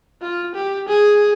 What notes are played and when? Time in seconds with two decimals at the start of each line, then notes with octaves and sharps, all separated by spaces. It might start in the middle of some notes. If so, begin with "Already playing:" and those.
0.22 F4
0.55 G4
0.88 G#4